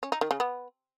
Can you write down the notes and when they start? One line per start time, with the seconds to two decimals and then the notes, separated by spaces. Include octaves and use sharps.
0.03 C#4
0.12 D#4
0.21 D#3
0.31 C#3
0.40 B3